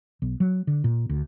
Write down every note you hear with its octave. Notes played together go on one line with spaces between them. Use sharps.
B1
F#3
D3
A#2
D2